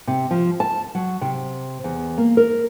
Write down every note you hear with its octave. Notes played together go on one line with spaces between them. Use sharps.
C3
F3
A5
F#3
C3
E2
A#3
A#4